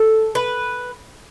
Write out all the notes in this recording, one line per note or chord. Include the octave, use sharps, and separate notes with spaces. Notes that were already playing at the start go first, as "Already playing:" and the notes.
Already playing: A4
B4